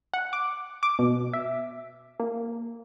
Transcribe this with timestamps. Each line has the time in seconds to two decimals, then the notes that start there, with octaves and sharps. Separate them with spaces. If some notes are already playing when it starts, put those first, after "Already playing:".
0.14 F#5
0.33 D6
0.83 D6
0.99 B2
1.33 E5
2.20 A#3